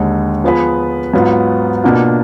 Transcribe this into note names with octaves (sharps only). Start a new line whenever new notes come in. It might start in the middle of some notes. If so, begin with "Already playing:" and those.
Already playing: D#2 D3 G#3
F3 B3 F4 G#4 B4
G#2 F#3 B3 F4
B2 A#3 D4 F4